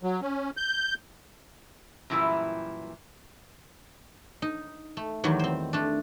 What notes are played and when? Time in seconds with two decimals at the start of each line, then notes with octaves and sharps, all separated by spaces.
0.03 F#3
0.22 C#4
0.57 G6
2.10 F#2 A#2 E3 G3 E4
4.42 D#4
4.97 A3
5.24 E2 D#3 F#3 G3 G4 C#5
5.39 C4 C5
5.73 A3 D4